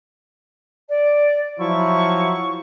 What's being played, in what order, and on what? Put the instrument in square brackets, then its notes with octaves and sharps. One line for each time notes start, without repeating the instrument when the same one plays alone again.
[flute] D5
[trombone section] F3 F#3 E4 [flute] C#6